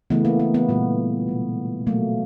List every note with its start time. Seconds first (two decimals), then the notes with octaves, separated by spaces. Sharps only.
0.10 C#3 E3 A3 B3
0.25 A#3
0.40 A#3
0.54 B3
0.69 A#2 G3 A#3
1.28 B2 G#3
1.86 B2 F#3 A3 A#3